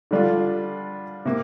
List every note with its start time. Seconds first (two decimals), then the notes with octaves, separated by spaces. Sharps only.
0.11 D3 G3 D4 F4
1.25 C3 A#3